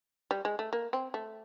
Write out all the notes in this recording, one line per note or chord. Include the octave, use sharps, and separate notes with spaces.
G3
G#3
A3
A#3
C4
A3